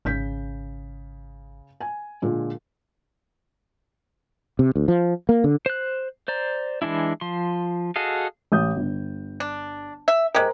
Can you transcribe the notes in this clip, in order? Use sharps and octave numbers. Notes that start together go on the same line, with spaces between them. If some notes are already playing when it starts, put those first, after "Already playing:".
G#1 C#3 G6 B6
G#5
A#2 D3 G#3
C3
D2
F3
A#3
D3
C5 F#6
C5 D5 A#5
E3 G#3 D4 E4
F3 C6
F#4 G#4 A4 D#5 F5
A1 D#6 G6
G1
D4
E5
G#3 G4 A#4 C5